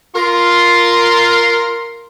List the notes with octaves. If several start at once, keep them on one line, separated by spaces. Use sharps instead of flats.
F4 A#4 C6